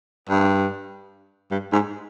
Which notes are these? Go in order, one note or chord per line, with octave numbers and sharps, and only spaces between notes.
G2
G2
G#2